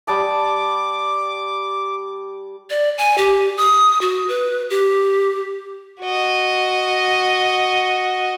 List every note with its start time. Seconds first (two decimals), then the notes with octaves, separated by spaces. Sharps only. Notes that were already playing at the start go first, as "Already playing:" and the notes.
0.07 G3 A5 D6 D#6
2.70 D5
2.98 G#5
3.18 G4
3.57 D#6
4.01 F#4
4.29 B4
4.70 G4
6.01 F#4 D#5